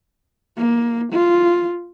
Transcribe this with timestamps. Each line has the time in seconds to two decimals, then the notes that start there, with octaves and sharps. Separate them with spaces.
0.57 A#3
1.13 F4